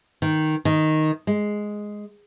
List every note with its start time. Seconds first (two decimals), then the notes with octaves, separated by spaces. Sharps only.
0.22 D#3
0.65 D#3
1.27 G#3